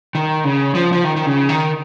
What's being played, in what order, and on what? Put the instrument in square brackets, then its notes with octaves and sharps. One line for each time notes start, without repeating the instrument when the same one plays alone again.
[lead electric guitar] D#3
C#3
F3
F3
D#3
D#3
C#3
D#3